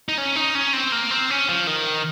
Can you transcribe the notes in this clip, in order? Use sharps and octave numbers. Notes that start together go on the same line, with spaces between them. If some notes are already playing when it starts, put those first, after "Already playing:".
D#4
C#4
D#4
C#4
C4
A#3
C4
C#4
F3
D#3